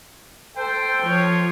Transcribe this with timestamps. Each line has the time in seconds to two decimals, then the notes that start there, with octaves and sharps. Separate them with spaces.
0.58 A4 C5 G5
1.02 F3 C#5